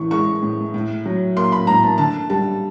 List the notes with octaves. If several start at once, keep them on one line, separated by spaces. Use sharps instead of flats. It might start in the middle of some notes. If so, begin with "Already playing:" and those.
Already playing: A2 E3 C#6
G#3 C#6
A2
A2
F#3
A#3 C6
B5
A2 A#5
A5
D3 A5
G3 A5